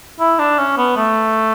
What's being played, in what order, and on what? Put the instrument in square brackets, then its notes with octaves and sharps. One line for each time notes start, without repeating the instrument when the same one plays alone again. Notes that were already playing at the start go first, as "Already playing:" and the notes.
[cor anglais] E4
D4
C#4
B3
A3